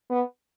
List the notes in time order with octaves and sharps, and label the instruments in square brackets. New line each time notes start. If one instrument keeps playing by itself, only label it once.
[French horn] B3